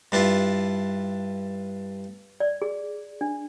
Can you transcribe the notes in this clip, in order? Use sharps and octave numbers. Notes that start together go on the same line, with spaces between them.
G2 D4 E4 F4
D5
G#4
D4